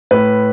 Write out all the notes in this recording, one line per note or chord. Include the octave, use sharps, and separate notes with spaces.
A2 B4